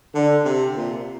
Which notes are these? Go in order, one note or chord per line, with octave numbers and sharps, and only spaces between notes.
D3
C3
A#2